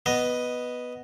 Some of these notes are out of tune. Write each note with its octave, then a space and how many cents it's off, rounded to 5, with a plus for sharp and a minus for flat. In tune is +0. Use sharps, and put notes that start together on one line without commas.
B3 +0 D#5 +0